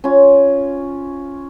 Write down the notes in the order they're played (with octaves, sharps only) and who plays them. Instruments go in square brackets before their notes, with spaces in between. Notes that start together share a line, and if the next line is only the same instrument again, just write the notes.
[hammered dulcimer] C#4 F4